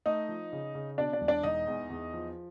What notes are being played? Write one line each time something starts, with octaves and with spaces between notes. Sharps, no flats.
A3 D#4 D#5
F3
C#3
C#3
B2 D4 D5
D4 D5
E1
D4 D5
E1 D#4 D#5
E2
E2
F3